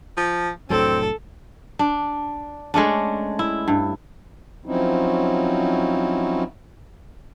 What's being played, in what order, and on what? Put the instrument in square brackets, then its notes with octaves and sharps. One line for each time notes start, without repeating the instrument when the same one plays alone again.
[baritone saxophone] F3
[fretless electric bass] F1 A2 F#3 [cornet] C4 [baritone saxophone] D4 [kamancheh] A4
[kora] D4
G#3 A3 C#4 D4
E4
G2
[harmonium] F3 F#3 C4 C#4 D#4 E4